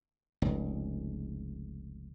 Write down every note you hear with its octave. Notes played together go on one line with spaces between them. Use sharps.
F1 C#2